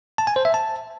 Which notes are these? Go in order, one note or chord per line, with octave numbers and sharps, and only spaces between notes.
A5
G#5
C5
E5
A5